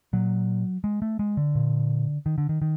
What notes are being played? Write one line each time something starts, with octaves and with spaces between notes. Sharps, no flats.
A#2 F#3
G#3
A3
G#3
D3
A#2
D#3
D3
D#3
D#3